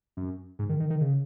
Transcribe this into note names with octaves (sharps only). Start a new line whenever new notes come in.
F#2
G#2
D#3
D#3
D#3
C#3